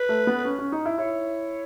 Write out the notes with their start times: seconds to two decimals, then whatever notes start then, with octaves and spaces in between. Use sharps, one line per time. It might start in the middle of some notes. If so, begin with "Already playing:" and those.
Already playing: B4
0.09 A3
0.27 B3
0.45 C#4
0.59 C#4
0.72 D#4
0.85 E4
0.98 E4 C#5